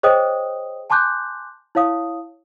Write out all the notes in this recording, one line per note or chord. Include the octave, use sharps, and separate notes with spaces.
G#4 C5 C#5 D#5 G5 D#6
G#5 A5 C6 D6 F#6 G6
E4 C#5 F5 D#6